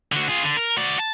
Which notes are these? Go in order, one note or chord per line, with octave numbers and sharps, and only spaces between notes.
D3 F#4
F4 G#4
D3
A#4
F#4 D5
A5